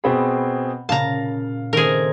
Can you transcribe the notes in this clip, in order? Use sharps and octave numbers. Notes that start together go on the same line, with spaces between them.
B2 C4 G#4 B5
A#2 C#3 F5 A5 A#5
D#3 A3 C4 G#4 A#4